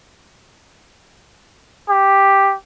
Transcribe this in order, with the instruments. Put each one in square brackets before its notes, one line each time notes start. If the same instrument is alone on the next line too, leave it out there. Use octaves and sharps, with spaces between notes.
[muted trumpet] G4